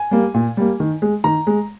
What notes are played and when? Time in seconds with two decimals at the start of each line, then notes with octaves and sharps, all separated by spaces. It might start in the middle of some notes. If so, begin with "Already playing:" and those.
Already playing: G#5
0.11 G3 A#3
0.34 A#2
0.57 G3 A#3
0.80 D#3
1.02 G#3
1.24 D#3 A#5
1.47 G#3